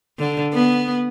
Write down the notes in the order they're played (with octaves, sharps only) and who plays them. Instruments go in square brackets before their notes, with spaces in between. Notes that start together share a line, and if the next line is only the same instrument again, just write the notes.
[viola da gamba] D3
B3